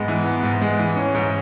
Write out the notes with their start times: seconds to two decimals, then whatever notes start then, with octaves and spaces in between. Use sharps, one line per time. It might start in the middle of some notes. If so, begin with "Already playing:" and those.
Already playing: G#2 G#3 B3
0.08 E3
0.26 B3
0.43 G#2
0.61 G#3
0.79 E3
0.96 C#4
1.14 G#2